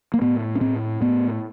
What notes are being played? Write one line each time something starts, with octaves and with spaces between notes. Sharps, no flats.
A#3
A2 B3
C#4
A2 C4
A2 B3